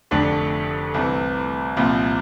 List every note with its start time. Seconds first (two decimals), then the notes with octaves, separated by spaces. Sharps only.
0.11 F1 F2 D3 A3 D4
0.94 C2 C3 E3
1.77 C2 A#2 F3 C4